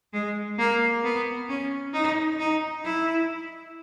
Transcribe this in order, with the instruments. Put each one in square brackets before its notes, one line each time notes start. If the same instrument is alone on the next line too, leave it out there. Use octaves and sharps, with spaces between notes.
[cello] G#3
A#3
B3
C#4
D#4
D#4
E4